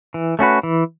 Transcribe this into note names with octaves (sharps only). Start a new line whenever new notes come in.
E3
A3 C#4 F#4 B4
E3